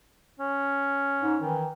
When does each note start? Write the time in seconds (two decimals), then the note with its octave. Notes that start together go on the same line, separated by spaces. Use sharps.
0.40 C#4
1.22 G#2
1.41 D#3 E3